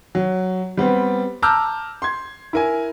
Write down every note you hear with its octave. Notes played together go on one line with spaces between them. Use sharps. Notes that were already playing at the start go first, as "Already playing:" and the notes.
F#3
G3 B3 C4
A5 A#5 D6 E6 F6 G6
C6 G#6
E4 A#4 G#5